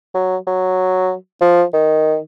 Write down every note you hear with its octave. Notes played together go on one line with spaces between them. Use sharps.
F#3
F#3
F3
D#3